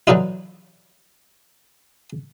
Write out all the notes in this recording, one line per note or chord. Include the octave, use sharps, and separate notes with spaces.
D3 E3 F#3 D#4 E4